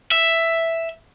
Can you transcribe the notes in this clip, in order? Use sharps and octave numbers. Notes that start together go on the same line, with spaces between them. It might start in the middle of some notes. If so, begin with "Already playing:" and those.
E5